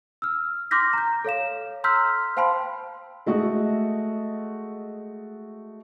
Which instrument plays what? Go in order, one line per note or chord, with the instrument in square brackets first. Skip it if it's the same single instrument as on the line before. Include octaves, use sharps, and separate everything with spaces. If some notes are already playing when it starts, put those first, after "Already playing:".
[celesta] E6 F6
C6 D6 F6 G6 A#6 B6
A#5 G6
A4 C#5 F5 E7
A#5 C6 E6 F6 G6 B6
C5 F5 G5 A5 B5 C6
[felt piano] G#3 A3 F#4 D#5 E5